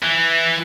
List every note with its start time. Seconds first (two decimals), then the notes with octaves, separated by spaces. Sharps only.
0.02 E3